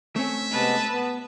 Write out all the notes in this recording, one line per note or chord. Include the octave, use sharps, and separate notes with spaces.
A3 C4 C#4 E5
C3 G#3 B3 B4 A5
B3